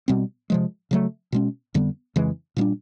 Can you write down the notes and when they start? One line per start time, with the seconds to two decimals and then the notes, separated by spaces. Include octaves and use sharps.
0.08 B2 G3 C4
0.50 C3 F3 G#3
0.91 C#3 F#3 A3
1.32 B2 G#3 C#4
1.74 F2 D3 G3 B3
2.16 F2 C#3 E3 G#3
2.57 A#2 G3 A#3 D4